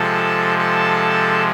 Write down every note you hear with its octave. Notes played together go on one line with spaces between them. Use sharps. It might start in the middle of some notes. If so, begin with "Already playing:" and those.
Already playing: C3 F3 G#3 A4 A5
A4 A5